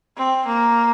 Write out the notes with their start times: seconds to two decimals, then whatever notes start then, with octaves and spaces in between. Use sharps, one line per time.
0.18 C4
0.47 A#3